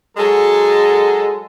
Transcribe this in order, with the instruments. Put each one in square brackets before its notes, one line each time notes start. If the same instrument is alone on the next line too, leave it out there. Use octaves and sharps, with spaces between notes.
[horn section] F#3 G#3 A4